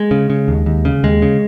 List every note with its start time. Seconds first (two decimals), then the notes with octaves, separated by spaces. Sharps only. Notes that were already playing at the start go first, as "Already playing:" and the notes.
Already playing: G#3
0.11 C#3
0.30 C#3
0.48 D#2
0.66 D#2
0.85 C#3
1.03 D#2 G#3
1.22 C#3